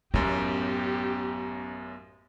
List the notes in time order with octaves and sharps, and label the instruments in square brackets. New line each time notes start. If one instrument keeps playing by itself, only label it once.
[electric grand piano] A1 F#2 [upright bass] B3 [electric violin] G4